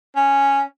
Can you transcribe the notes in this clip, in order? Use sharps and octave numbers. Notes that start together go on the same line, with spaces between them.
C#4